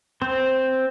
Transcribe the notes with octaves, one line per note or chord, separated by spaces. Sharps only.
C4 C5